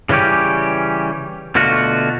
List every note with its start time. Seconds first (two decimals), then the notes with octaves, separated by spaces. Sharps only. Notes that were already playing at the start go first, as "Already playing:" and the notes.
0.09 C#3 E3 G3 C#4 G4
1.55 B2 D3 A3 F4 F#4